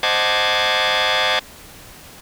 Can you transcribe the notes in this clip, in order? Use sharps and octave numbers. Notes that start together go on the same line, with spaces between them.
C5 D#5 F#5 A5 D6 G#6